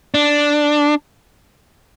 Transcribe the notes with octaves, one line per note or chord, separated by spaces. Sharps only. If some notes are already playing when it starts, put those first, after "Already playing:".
D4